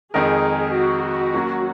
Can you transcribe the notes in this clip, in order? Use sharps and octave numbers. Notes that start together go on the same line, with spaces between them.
F2 D#3 G#3 D#4 G#4 A#4
F#4
F#3 A#3 C#4